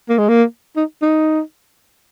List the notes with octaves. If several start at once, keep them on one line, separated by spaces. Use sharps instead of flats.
A#3
G#3
A#3
D#4
D#4